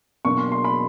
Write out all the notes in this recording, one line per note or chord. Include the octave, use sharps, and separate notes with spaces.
B2 F#3 A#3 D4 C#6
C6
C6
B5